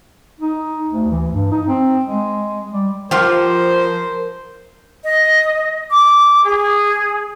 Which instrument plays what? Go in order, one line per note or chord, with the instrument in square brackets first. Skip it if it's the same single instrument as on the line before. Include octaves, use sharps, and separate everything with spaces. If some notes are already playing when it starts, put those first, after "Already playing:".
[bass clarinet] D#4
D2
E3
G2
D#4
C4
G#3
G3
[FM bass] F3 [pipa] F4 G4 [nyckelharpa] A#4 [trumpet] C5
[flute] D#5
D6
G#4